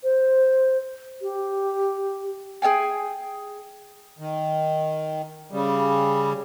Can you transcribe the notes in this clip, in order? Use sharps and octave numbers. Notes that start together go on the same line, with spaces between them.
C5
G4
G#4 C#5 G5 G#5
D#3
C#3 G3